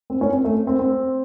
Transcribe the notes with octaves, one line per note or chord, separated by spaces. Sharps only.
C4
C#4
C4
A3
C4
C4